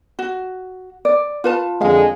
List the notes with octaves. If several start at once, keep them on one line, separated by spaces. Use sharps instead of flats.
F#4
D5
F4 B4 A5
F2 D3 G#3 F5